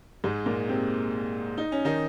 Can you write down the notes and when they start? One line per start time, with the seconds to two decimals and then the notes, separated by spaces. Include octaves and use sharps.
0.24 G#2 G#3
0.46 A#2 A#3
0.68 C3 C4
1.58 D#4
1.72 C#4
1.85 D#3 D#4